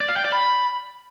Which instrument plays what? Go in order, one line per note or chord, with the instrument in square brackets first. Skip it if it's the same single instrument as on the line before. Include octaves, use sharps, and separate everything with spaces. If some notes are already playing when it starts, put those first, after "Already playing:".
[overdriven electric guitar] D5
F5
G5
D5
B5